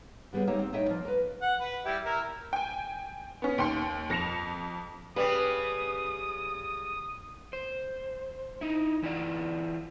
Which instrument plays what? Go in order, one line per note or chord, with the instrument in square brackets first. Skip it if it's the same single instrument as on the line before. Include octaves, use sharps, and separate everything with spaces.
[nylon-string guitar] D3 G3 B3 C#4 G#4
G3 A#3 C4 D#4 C#5 E5
C4
A2 D#4 C#5 D#5 E5 G5
F3 A#3
A#4 B4
[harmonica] F#5
B4
G3 E4 G4
E4 A#4
[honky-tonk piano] G5 G#5
B3 C#4
D#2 G5 C6 C#7
F2 A#6 C#7 E7 F7
[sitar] C#3 G3 [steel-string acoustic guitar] B4 [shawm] D#6
[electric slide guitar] C5
D#4 E4
E3 E4 F4 D5